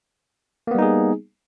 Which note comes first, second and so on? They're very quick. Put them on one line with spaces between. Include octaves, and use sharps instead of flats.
A#3 B3 G3 D#4 G#4